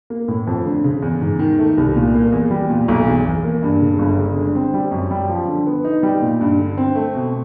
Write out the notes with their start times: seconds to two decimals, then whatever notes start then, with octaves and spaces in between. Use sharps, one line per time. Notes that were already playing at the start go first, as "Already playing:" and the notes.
0.10 A#3
0.28 A2
0.47 F2
0.66 D3
0.84 C#3
1.02 E2
1.21 G#2
1.39 D#3
1.59 A3
1.77 C2
1.96 A#2
2.15 A#3
2.32 E2
2.51 G3
2.70 A#2
2.88 B1
3.07 E2
3.26 E2
3.44 A#3
3.63 G2
3.81 C#3
3.99 G1
4.19 G#3
4.36 D3
4.55 C4
4.74 G3
4.91 F#2
5.11 G3
5.29 F3
5.48 D3
5.67 B3
5.84 D#4
6.03 G3
6.22 A#2
6.41 G2
6.58 D3
6.78 C4
6.95 A3
7.15 B2